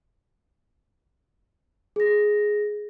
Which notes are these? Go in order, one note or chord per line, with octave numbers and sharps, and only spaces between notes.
G#4 A#6